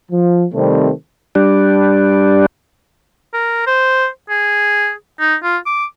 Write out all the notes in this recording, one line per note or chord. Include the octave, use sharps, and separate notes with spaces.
F3
C3 D#3 G3 A3 C4
G3 D4
A#4
C5
G#4
D#4
F4
D6